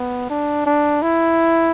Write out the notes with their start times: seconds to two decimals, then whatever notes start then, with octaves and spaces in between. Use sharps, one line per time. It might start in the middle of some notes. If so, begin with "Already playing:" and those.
Already playing: B3
0.30 D4
0.66 D4
1.02 E4